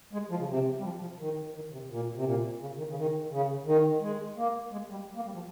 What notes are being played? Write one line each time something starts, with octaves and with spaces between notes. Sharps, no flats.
G#3
F3
C#3
C3
G3
F3
F3
D#3
D#3
C3
A#2
C3
A#2
C#3
D#3
C#3
D#3
C#3
D#3
G#3
A#3
G#3
G3
A#3
G3
F3